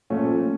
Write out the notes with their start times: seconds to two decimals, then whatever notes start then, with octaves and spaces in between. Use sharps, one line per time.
0.10 A#2 F3 A3 C#4